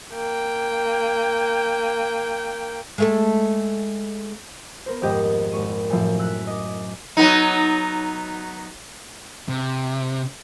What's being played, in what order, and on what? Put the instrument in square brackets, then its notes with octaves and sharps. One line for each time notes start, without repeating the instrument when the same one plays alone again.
[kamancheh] A#3 G5
[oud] G#3 A3 A4
[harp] B3 A#4 C5
D#1 F2 G#2 G4 A#4 D#5
G#1 C#6 D#7
F#2 A2 C3 F3
E6 F#6 B6
D#5 D6
[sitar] F#3 B3 D#4
[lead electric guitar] C3